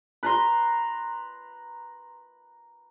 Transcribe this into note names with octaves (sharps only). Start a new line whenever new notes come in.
B4 A#5 C6